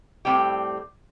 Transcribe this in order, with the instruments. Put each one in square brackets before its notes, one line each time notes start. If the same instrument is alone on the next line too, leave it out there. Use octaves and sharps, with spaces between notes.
[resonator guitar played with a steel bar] A2 G3 C4 G4